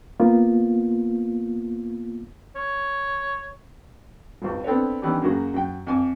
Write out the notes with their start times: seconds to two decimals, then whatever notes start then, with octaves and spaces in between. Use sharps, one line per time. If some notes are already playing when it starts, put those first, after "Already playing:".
0.20 A#3 B3 F4
2.55 C#5
4.42 G#1 C#2
4.64 B3 C4 D4 A4 B4 C#5
5.02 D#3 E3 B3 C#4 D4 G4
5.21 F#2 C#3 F#3 A#3 F#4 G#4
5.54 F#2 G5
5.87 F2 G#5 D6